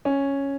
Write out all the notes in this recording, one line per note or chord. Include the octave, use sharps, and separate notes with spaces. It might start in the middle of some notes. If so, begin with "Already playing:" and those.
C#4